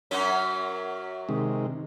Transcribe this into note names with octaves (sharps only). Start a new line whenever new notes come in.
F#2 F#3 C#4
C3 D#3 G#3